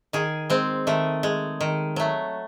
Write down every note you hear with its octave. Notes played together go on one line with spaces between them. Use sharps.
D#3 G#4
G#3 C4
D#3 A3
G#3
D#3
F#3 A3